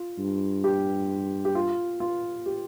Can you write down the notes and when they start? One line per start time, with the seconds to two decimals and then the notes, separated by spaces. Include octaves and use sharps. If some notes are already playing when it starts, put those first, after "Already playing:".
Already playing: F4
0.19 G2
0.64 G4
1.45 G4
1.55 F4
2.00 F4
2.46 G4